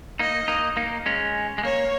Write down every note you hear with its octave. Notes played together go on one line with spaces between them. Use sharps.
A#3 D#4 D#5
A#3 D#4
A#3 D#4
G#3 C#4
G#3
A#3 C#5